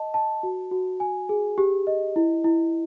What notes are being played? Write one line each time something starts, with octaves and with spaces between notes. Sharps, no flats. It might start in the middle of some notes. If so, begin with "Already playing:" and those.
Already playing: D#5 A5
A5
F#4
F#4
G#5
G#4
G4
D#5
E4
E4